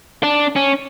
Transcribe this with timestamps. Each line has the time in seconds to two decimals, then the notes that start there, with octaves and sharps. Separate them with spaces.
0.23 D4
0.56 C#4